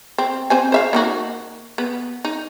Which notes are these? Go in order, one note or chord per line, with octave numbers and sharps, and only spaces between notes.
C4
C4 C5 G#5
C5 E5 F5
A#3 D#4 F#4
B3
D#4